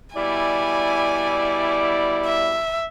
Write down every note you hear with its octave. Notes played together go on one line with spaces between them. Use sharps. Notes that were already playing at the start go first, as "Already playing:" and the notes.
B2 G3 E4 D5 G#5
E5